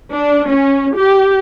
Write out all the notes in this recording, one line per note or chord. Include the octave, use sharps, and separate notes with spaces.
D4
C#4
G4